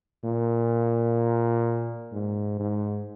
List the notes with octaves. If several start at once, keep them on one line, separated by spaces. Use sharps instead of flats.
A#2
G#2
G#2